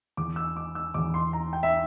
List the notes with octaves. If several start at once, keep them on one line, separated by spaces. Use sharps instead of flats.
E2 E3 D6
E6
D6
E6
E2 E3 D6
C6
A#5
G5
E5